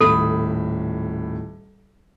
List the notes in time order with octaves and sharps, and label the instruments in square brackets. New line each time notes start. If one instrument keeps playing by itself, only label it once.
[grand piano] D#1 A2 B5 [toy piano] A4